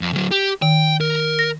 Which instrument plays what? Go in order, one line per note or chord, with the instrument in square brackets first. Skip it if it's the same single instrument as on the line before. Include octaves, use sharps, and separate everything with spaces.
[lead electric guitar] F2
D2 F#3
G4
[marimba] D#3 [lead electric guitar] G5
[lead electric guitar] A#4
[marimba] A#6